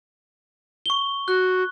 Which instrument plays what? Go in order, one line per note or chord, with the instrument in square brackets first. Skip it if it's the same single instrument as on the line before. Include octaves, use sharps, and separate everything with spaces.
[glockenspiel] C#6 G7
[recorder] F#4 [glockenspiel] F#6